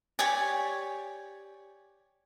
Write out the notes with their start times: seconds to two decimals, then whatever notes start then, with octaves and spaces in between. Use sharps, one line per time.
0.19 G4 C#5 D5 G#5